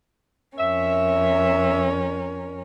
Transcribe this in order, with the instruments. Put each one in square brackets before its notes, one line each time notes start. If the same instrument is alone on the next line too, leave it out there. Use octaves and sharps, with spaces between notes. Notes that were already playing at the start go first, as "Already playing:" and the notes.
[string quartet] F2 C#4 A#4 [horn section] E5